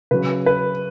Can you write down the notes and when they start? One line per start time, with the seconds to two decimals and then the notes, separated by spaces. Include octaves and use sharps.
0.11 C#3 F#3 B4
0.46 B4